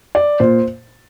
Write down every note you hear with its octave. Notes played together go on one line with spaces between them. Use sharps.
D5
A#2 C5